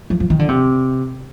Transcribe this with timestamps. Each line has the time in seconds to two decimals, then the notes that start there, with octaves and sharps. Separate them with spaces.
0.10 F3
0.20 F3
0.30 D#3
0.39 D3
0.48 C3